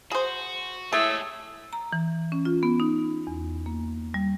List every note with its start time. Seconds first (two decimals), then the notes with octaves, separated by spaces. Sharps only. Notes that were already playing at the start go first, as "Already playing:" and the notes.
0.11 F#4 G#4 C5
0.93 A2 G#3 A3 G4 G#4 E6
1.73 A#5
1.93 E3
2.32 C#4
2.45 F4
2.63 B3
2.80 D#4
3.27 E2
3.66 A#3
4.14 G3